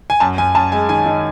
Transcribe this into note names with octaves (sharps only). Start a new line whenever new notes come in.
G#5
F#2 A5
F#2 G#5
F#2 A5
G#3 G#5
D#3 G#5
D#3